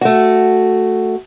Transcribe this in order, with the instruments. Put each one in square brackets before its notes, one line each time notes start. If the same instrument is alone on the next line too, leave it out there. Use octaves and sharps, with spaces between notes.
[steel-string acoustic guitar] A3 F#4